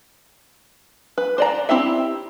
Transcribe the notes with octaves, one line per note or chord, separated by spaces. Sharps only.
B4
C5 D5 A#5
C4 E4 G4 E5